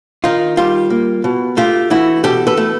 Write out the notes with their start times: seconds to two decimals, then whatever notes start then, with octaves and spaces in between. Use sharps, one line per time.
0.24 D#3 D#4 F4
0.57 G3 F4 G4
0.90 A#3
1.24 B2
1.57 A3 F4 G4
1.90 E3 E4 F#4
2.24 B2 G4 A4
2.47 A4 B4
2.57 A3